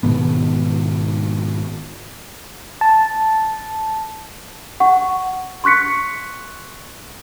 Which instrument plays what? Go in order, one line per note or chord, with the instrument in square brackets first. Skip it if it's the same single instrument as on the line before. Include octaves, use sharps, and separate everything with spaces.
[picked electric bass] G#2 B2 D#3 B3
[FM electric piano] A5
[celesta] F#5 C#6
C6 C#6 F#6 B6 C#7